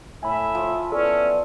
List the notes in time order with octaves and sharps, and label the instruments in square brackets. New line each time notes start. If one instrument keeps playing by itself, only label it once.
[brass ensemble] A2 [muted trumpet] E5 [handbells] G#5 B5
[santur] F3
[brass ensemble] B3 E4 D5 [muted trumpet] C#4 [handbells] A4